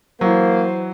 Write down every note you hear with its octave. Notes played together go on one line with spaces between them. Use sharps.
E3 F#3 A#3 C5